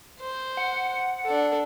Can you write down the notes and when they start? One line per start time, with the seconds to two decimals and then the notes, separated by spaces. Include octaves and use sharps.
0.20 C5
0.57 F#5
1.25 D4 A4